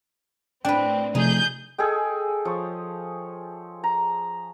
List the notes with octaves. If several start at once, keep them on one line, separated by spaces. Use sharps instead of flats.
A2 C4 D4 B4 G5
C3 F3 A3 D#4 G#4 G6
G#4 A4 D#5 G5
F3 C#5
A#5